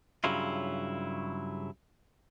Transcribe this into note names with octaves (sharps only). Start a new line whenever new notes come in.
G2 C#3 F#3 E4 F4